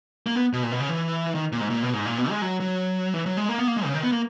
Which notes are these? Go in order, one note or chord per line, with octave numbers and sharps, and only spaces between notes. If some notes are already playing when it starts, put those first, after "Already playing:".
A#3
B3
B2
A#2
B2
C#3
E3
D#3
A#2
G#2
A#2
B2
G#2
A#2
B2
G#3
F#3
F#3
E3
F#3
G#3
A#3
B3
A#3
G#3
C#3
D#3
B3
A#3